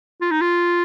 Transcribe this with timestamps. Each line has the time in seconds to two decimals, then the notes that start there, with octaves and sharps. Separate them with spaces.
0.21 F4
0.31 D#4
0.41 F4